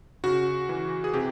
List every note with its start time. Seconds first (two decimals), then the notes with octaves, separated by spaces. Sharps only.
0.24 C#3 F#4
0.69 E3
1.04 G#4
1.13 C3 G4